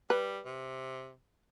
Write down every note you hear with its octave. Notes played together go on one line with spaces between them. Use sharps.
G3 B4
C3